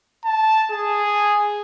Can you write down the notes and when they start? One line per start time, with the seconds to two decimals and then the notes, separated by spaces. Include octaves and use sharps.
0.25 A5
0.72 G#4